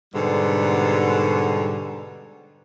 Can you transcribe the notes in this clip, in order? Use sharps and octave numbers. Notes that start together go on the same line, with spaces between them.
G#2 B2 D3 G3